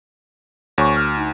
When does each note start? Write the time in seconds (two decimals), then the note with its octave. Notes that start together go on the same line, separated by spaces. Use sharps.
0.78 D2 C#5 G#5 C#6
0.96 F6
1.18 D#4